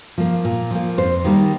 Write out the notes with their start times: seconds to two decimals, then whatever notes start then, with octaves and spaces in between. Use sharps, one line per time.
0.18 F3 A#3
0.45 A#2
0.71 F3 A#3
0.98 F2 C5
1.25 D#3 G3 A#3